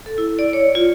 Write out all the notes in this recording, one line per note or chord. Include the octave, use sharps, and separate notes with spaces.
A4
E4
D5
C#5
F4